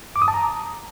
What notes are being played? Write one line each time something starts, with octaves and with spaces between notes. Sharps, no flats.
D6
D#6
A5
A#5